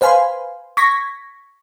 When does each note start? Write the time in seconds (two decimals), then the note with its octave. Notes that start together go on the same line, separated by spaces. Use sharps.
0.01 B4 C5 F5 G#5 B5 C6
0.77 C#6 G#6 A#6 B6